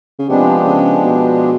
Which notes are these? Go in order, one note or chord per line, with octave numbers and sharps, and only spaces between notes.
C#3
C3 F3 G#3 B3 D4 G4
C#3
B2